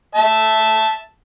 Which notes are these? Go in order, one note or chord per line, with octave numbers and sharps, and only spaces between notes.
E5 A5